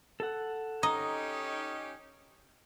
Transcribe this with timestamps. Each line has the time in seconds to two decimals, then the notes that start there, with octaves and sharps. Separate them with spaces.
0.20 A4 F#5
0.83 C#4 D#4 G4 D#5 A#5 D#6